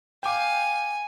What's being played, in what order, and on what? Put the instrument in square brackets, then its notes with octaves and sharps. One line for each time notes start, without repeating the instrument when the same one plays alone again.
[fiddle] F5 [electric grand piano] G5 D6 [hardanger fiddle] G#5